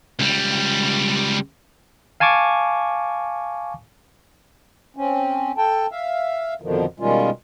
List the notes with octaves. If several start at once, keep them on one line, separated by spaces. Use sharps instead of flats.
C#2 G3
F5 G#5 A5 C#6 D6
C4 C#4
A4 G5 A5
E5 F5
F2 B2 D3 D#3 F3
B2 D#3 G3 G#3 C#4 F4